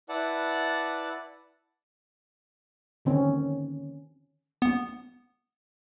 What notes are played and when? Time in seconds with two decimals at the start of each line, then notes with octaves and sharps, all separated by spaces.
0.09 E4 B4 D5 F#5 A5
3.05 D3 D#3 C4 C#4
4.62 B3